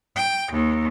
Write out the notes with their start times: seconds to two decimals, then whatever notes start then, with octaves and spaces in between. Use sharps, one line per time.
0.16 G5
0.52 D#2